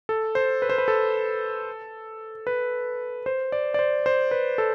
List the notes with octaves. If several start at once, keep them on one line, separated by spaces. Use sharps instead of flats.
A4
C5
B4
C5
B4
A4
B4
C5
D5
D5
C5
C5
B4
A4